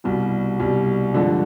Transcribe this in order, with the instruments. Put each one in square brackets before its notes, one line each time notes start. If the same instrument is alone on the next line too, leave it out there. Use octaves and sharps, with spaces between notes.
[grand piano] C2 B2 G3
C2 B2 G3
G2 D3 F3 G#3